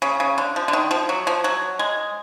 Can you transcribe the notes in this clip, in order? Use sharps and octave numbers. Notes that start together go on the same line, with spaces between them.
C#3
C#3
D3
F3
D3
D#3
F3
F#3
F3
F#3
G#3